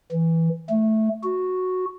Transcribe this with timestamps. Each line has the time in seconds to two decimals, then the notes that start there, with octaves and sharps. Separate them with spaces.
0.12 E3
0.69 A3
1.23 F#4